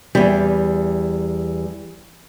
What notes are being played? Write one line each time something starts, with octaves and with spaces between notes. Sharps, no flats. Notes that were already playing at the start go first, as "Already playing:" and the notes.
E2 G3